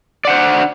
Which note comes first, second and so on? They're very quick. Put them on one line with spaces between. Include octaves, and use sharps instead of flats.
D5 F#5 C5 D4